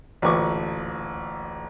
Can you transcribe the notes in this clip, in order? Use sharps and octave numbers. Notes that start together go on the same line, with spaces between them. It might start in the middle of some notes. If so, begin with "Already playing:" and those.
A1 D2 A#2 B4 C#6 D6